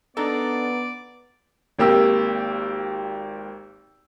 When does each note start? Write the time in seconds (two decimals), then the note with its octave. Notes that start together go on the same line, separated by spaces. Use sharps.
0.17 B3 D4 D#4 A4 D5 A#5
1.79 G#1 A#3 G4 E6